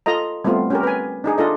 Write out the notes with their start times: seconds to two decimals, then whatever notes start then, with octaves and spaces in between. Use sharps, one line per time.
0.06 F4 A4 D#5 A#5
0.44 G3 A3 B3 C4 F4
0.70 C#4 G4 A#4
0.83 B4 G#5
1.24 D4 D#4 G#4
1.38 D4 F4 A4 D#5